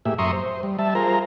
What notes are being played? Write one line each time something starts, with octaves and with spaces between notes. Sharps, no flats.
A2 A#3 G4 G#4 E5
F#2 E5 A#5 C6 C#6 D#6
C5
G3
G3 E5 A5
F4 G#4 A#4 C5 A#5